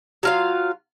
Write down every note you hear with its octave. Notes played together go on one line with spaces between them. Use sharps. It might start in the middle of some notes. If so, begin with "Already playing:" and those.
F#3 F4 F5